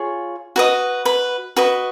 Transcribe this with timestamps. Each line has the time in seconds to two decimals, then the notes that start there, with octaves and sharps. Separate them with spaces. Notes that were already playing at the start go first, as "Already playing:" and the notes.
Already playing: F4 G#4 C#5
0.56 F#4 B4 D#5
1.05 B4 B5
1.56 F#4 B4 D#5